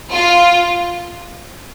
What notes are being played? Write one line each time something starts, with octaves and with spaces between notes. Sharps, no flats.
F4